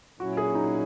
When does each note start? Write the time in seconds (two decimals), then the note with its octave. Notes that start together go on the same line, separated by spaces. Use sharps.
0.19 A#2 F#3 C#4 E4 F#4
0.37 G#4
0.55 D#4